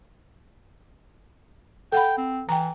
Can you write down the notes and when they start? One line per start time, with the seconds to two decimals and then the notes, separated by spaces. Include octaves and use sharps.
1.92 A4 F#5 G5 B5
2.18 C4
2.49 E3 G5 A#5